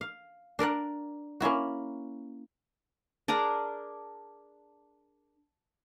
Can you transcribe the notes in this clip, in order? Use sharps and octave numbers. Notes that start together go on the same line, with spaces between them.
F5
D4 A#4 D5 F#5
A#3 C#4 E4 F#4
D4 G#4 A#4 A#5